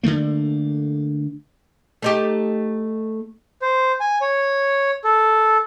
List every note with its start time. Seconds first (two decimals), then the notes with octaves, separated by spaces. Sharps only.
0.03 D3 F3 A3 A#3
2.02 A3 D#4 G4
3.62 C5
4.00 G#5
4.21 C#5
5.04 A4